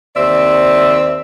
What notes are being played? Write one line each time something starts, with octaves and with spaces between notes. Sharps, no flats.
D#2 C4 D5 E5